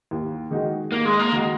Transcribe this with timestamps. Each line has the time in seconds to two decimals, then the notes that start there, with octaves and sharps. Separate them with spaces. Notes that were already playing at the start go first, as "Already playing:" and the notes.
0.11 D#2
0.51 D#3 G#3 D#4 F#4
0.91 D#2 A#3
1.05 G#3
1.19 A#3
1.32 D#3 G#3 D#4 F#4